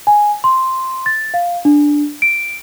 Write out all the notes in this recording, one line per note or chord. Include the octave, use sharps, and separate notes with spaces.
G#5
C6
A6
F5
D4
D7